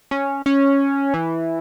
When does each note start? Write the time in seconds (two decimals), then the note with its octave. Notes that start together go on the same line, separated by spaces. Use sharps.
0.11 C#4
0.46 C#4
1.14 E3